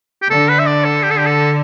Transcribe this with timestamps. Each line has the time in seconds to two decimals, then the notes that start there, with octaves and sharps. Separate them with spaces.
0.22 G4
0.30 D3 A4
0.49 B4
0.59 E5
0.67 D5
0.85 A4
1.03 G4
1.11 A4
1.18 G4
1.26 A4